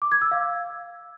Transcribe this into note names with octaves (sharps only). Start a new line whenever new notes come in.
D6
G#6
E6
F5